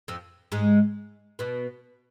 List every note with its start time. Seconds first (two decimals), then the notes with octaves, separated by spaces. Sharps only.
0.08 F2 F3
0.52 G#2 G#3
1.39 B2 B3